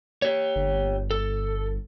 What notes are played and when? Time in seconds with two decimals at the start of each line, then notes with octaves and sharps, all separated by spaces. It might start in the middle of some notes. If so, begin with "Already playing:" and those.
0.22 G4 C#5
0.56 G1
1.11 A4